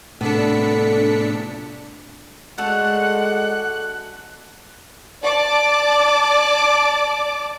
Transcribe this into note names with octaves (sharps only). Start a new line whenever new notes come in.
A2 C3 B3 D4 A4 B6 C#7
G#3 A3 D4 F#4 F#5 F#6
D5 A5 D6